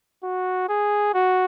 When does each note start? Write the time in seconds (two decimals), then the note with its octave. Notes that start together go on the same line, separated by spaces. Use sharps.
0.24 F#4
0.69 G#4
1.14 F#4